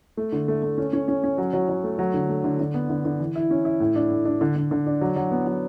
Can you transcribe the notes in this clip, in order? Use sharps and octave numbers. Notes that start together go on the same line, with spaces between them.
A3
D3
A3
A3
C#4
C#4
C#4
C#4
F#3
F#3
F#3
A3
F#3
D3
A3
D3
D3
B3
D3
D3
E3
E4
C#4
E4
A2
D4
A2
D4
D3
D3
D3
D4
F#3
F#3
B3
F#3